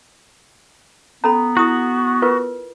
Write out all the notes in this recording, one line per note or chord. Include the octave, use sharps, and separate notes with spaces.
B3 C#4 A4 A#5 B5
E4 F#4 D#6
F4 A#4 B4